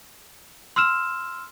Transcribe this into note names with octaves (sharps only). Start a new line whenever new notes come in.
C6 E6 F6 E7